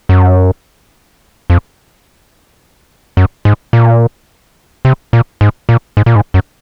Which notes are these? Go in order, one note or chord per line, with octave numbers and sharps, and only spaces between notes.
F#2
F2
F#2
G#2
A#2
C3
A#2
G#2
A#2
G#2
A#2
G#2
F#2